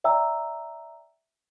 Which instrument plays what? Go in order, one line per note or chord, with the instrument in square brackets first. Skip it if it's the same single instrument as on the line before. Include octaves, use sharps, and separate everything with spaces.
[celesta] D5 E5 G5 A#5 E6